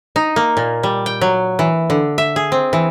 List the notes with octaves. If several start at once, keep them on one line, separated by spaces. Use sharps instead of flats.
D#4
A#3
A#2
G3
G5
F#3
E3
D3
E5
G#4
C4
E3